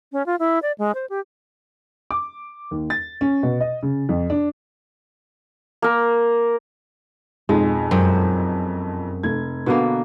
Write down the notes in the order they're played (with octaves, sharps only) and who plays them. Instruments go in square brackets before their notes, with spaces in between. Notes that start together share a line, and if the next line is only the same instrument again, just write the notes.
[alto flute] C#4
F4
E4
D5
G#3
C5
G4
[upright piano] D6
D#2
A6
C#4
B2
D#5
C#3
F2
D4
[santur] A#3 A#4
[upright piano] B1 F2 G#2 [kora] G#3
[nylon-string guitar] F#2 [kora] C4
[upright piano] F1 A3 G#6
[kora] B2 D3 A#3 [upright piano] B3